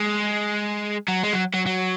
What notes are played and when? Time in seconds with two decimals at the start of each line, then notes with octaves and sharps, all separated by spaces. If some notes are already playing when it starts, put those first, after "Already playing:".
Already playing: G#3
1.08 F#3
1.23 G#3
1.33 F#3
1.54 F#3
1.66 F#3